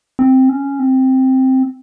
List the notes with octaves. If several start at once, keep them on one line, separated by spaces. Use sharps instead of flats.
C4
C#4
C4